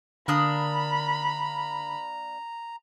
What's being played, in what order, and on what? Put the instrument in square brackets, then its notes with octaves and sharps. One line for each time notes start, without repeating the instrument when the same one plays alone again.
[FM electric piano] D3 [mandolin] A#3 D4 D#6 [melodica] A#5 [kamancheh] B5